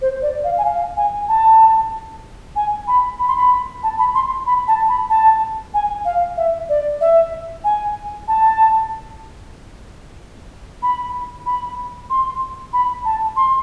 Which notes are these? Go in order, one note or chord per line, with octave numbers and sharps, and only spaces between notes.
C5
D5
F5
G#5
F5
G#5
A5
G#5
B5
B5
C6
B5
A5
B5
C6
B5
A5
B5
A5
G#5
F5
E5
D5
E5
G#5
A5
B5
B5
C6
B5
A5
C6